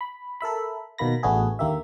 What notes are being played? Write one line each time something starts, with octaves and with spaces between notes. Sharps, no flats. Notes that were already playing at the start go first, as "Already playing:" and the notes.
B5
A4 A#4 E5 B5
B2 D#3 A#3 B5 A#6
A1 A3 B3 D4 F#4 G#4
D#2 D3 A#3 G4 E5